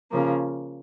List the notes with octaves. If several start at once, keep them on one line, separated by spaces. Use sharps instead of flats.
C#3 F3 A#3